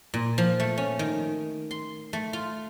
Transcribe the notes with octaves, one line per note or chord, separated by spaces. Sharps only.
A#2
F3
A3
C#4
D#3
C6
A3
F4